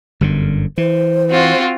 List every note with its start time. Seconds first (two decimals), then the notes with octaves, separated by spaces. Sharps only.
0.21 G1 F#2 D3
0.78 E3 C5
1.30 C4 F4 F#4